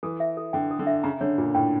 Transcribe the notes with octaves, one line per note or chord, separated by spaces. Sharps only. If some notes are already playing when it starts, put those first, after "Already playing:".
E3 A4
E5
A4
D3 G5
A4
D3
E5
C#3 A#5
D3 C#5
A#2 F4
A2 G5